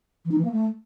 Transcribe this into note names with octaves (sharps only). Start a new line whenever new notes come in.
E3
D#4
E3
A#3
A3